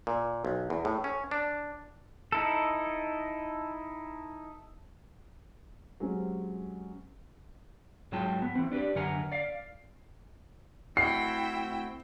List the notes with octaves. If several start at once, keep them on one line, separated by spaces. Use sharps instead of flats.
A#2
B1
E2
A2
C#4
D4
D#4 E4 A4
F#3 G#3 C4 C#4 F#4 G4
G#2 F#3 G#3 F4 G5 A5
B3
E3 C4
D4 G4 B4 D5
F#2 D3 A#4 F#5 G#5 A#5
D5 F5
A3 C4 E4 F#4 G5 C7